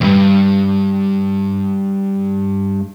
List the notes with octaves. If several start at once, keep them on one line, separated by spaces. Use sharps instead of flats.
D2 G2